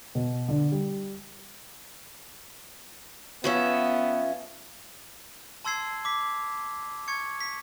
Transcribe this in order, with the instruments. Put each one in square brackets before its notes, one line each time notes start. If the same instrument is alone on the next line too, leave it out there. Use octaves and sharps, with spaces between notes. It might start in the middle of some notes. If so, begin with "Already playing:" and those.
[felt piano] B2
D3
G3
[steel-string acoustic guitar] F3 C#4 E5 [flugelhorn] B3
[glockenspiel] A5 C6 E6 G#6 C7
D6 B6
C#6 G#6 C#7
B6